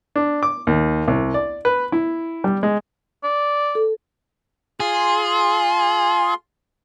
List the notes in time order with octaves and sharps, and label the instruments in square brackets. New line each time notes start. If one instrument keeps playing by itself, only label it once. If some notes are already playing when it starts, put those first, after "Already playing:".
[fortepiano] D4
D6
D#2
C2
D5
B4
E4
G3
G#3
[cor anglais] D5
[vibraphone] A4
[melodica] F4 C6 [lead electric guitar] G#4